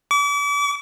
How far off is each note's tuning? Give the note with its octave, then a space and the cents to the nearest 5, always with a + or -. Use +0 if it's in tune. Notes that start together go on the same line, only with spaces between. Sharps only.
D6 -40